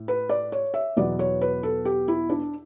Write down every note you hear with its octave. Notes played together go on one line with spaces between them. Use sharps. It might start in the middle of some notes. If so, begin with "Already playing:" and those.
Already playing: A2
B4
D5
C#5
E5
E2 B2 F#3 B3 D5
C#5
B4
A4
G4
E4
D4